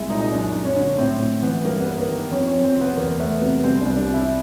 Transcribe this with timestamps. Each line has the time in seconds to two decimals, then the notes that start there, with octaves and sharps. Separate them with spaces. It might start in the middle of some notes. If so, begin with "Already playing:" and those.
Already playing: C2 G#3 E4
0.10 A#2 D#4
0.21 D#4
0.32 F#2 D4
0.54 F#2
0.65 C#4
0.77 D3
0.98 A2 C4
1.20 A2
1.42 E3 B3
1.65 G2 A#3
1.81 B3
1.87 A#3
1.98 A#3
2.09 D#3
2.31 F2 C#4
2.47 C#4
2.54 F2
2.64 C4
2.76 C3
2.81 B3
2.97 E2 A#3
3.20 A3 B3
3.42 C3 B3
3.64 C2 C4
3.81 D4
3.86 C2
3.97 D4
4.08 C3
4.14 E4